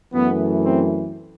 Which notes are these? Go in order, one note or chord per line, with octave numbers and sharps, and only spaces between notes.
F#2 E3 A3 B3
C4